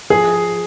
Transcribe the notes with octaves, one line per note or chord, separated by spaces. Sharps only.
F3 G#4